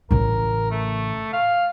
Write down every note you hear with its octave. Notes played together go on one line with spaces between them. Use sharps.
A1 C#3 A#4
A3
F5